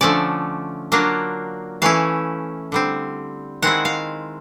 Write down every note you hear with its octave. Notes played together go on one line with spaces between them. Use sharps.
D3 F3 A3 C#4 D5
F#3 A#3 D4 F4
E3 A3 C#4 E4 F5
D3 G3 C4
D#3 G#3 C4 E4 F#5
F5